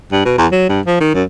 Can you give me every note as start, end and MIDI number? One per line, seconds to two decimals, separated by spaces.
0.12 0.22 43
0.25 0.33 47
0.38 0.47 40
0.52 0.68 54
0.69 0.80 43
0.86 1.00 53
1.00 1.14 51
1.14 1.23 42